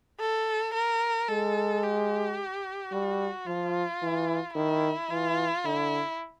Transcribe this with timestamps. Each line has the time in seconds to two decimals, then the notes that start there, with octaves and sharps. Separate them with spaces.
0.19 A4
0.74 A#4
1.28 G#3 A4
1.82 G4
2.92 G3 F#4
3.46 F3 F4
4.02 E3
4.55 D#3 E4
5.10 E3 F4
5.64 D3 E4